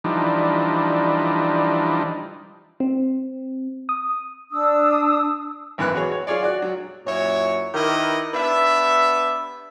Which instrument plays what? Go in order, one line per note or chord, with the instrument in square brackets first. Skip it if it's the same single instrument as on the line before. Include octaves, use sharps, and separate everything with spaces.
[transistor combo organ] E3 F3 G3 D4 D#4
[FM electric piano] C4
D#6
[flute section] D4 D#6 E6
[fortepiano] G#1 F#2 E3 B3 F#6
B3 F#4 G#4 C#5
C#5
F4 G#4 C#5 D5
F#4 D5 F#6
F#3
[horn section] F#2 A#2 E4 C#5
D#3 E4 G4 A#4 B4 D#5
B3 D4 G4 B4 E5